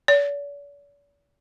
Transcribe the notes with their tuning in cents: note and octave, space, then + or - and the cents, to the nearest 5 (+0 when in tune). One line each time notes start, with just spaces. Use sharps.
D5 -45